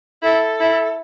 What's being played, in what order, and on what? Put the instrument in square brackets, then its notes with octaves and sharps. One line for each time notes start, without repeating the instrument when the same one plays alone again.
[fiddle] E4 [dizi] A4
[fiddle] E4